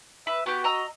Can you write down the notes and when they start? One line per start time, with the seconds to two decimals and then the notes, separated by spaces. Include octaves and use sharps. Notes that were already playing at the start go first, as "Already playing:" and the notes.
0.27 B4 E5
0.46 B3 F#4 G4
0.64 D#5 A#5 E6